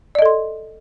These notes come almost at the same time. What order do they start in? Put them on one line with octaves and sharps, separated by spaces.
D5 D#5 A4 C6